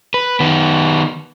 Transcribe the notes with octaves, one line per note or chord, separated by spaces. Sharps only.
B4
D#3 B3